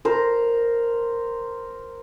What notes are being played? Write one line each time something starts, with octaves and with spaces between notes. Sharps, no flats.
A#4 C5